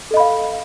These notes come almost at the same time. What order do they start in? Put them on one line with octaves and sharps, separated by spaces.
A4 D#5 B5 F5